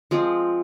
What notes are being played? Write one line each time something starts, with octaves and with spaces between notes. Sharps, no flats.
F3 G#3 C4